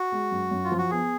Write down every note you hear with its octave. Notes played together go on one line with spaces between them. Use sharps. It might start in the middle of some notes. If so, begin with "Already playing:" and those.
Already playing: F#4
G#3
F#2
F#2
F4
F3
F#4
B3 G#4